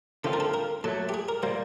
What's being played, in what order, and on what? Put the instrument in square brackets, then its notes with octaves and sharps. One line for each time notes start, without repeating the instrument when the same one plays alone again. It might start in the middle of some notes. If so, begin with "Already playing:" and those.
[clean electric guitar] D3 F3 A3 C4 F4 [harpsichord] A4
[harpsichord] A#4
A4
A#4
[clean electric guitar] A#2 F#3 A3 [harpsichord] A4
[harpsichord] G4
G#4
A#4
[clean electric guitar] A#2 G3 A#3 [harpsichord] C5